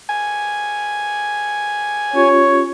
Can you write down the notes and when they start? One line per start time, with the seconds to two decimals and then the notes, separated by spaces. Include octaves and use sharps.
0.09 G#5
2.13 C#4 F4 G4 C#5